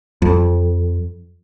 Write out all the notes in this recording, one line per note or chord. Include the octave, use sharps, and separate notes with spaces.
F2